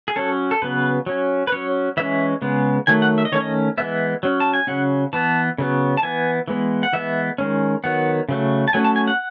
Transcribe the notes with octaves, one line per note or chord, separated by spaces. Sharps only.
G#4
F#3 C#4 A4
A4
C#3 F#3 B3 B4
F#3 C#4
B4
F#3 C#4 C#5
E3 G#3 C#4 E5
C#3 G#3 B3
D#3 F#3 A3 G#5
F#5
E5
D#5
D#3 A3 C#4 C#5
D#5
E3 G#3 B3 E5
F#3 C#4
A5
G#5
C#3 F#3 C#4 F#5
E3 B3 A5
C#3 F#3 B3
A5
E3 B3 G#5
E3 G#3 B3
F#5
E3 G#3 B3 E5
D#3 G#3 C#4
D#3 F#3 B3 F#5
C#3 F#3 A3
A5
F#3 A3 C#4 G#5
A5
G#5
F#5